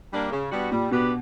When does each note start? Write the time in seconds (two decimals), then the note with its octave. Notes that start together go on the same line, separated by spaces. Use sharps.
0.11 G3 A#3 D4
0.31 C#3
0.52 G3 B3 D4 F#4
0.72 A#2 G3
0.91 B2 B3 D4 G4 B4